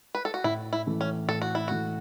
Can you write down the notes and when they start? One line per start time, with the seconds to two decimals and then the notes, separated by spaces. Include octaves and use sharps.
0.15 B4
0.25 A4
0.34 F#4
0.44 A2 E4
0.73 E4
0.87 E3 A3
1.01 C#4
1.28 A2 A4
1.42 F#4
1.55 E4
1.68 E3 A3 F#4